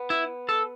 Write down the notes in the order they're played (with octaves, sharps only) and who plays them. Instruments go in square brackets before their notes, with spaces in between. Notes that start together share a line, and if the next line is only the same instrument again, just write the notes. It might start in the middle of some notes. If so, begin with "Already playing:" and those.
Already playing: [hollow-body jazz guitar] B3
[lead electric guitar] E4
A4